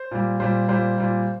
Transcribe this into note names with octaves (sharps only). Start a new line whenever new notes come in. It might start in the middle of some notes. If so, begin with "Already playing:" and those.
Already playing: C5
A#2 G3
A#2 G3 C5
A#2 G3 C5
A#2 G3